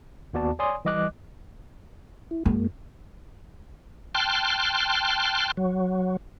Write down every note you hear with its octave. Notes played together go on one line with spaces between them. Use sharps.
D#2 B3 F#4 D5 A5
C#5 D5 G#5 C6 D#6
E3 G3 D#5 D6 F#6
E4
F#2 G#3 A#3
G5 A5 C6 F6 F#6
F#3